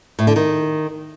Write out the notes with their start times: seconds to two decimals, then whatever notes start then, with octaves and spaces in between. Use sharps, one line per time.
0.19 A2
0.27 D3
0.36 D#3